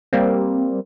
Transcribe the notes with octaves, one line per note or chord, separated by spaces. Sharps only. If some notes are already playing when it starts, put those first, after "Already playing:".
G3 A#3 C4